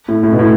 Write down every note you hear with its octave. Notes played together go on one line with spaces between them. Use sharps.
A2
A2
B2
A2